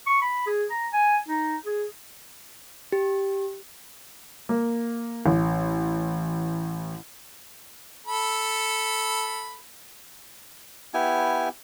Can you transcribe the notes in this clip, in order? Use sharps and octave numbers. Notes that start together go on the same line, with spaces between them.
C#6
B5
G#4
A#5
G#5
D#4
G#4
G4
A#3
A1
A4 B5
B3 E4 G4 G#5